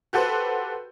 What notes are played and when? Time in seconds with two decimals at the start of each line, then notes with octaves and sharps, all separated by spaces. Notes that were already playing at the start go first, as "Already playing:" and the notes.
0.13 F#4 G4 A4 B4 C5